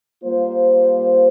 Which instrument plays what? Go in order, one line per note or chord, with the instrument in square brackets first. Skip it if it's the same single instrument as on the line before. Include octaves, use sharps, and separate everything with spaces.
[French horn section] G3 A#3 F4 C5